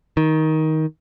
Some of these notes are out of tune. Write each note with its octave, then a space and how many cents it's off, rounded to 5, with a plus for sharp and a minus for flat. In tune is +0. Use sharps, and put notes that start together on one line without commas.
D#3 +15